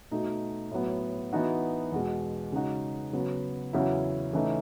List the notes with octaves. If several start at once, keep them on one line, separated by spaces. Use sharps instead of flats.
B2 A3 D#4 F#4
A2 F#3 B3
E3 B3 D#4 F#4
E2 B2 G#3
C#3 G#3 D#4 F#4
C#3 F#3 B3
E2 C#3 F#3 C#4 E4
C#3 E3 A3 D#4